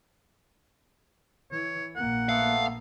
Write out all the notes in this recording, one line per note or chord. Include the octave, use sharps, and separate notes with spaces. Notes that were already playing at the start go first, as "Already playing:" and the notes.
E3 C#5
A#1 A#3 F#5
A3 B3 A4 F5